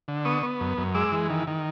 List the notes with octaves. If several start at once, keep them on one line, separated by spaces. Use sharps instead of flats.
D3
B3 C#6 D#6
B3
F#2
F#2
G#3 D6 E6
E3
D#3
D#3